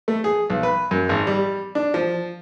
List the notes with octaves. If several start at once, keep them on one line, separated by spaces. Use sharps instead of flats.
A3
G#4
B1
B4
F#2
G#1
G3
D4
F3